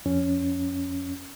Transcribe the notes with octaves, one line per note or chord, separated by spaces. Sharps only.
F2 C#4